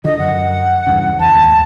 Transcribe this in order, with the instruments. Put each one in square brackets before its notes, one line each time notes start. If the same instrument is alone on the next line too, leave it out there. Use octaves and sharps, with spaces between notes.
[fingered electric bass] D3 F3 [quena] D#5
[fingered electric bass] F#2 [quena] F#5
[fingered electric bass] E2 G2 C#3
[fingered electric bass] E2 [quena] A5
[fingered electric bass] D#2 G#2